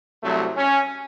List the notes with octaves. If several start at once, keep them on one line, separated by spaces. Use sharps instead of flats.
C2 C3 F#3 A3
C#4